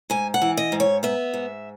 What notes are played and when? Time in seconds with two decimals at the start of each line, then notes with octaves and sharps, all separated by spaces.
0.10 G#2 G#5
0.34 F#5
0.42 E3
0.57 D#5
0.72 G#2
0.80 C#5
1.03 B3 E5
1.34 G#2